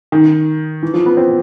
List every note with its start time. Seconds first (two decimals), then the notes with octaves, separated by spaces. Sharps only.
0.12 D#3
0.83 E3
0.94 F3
1.06 B3
1.17 C4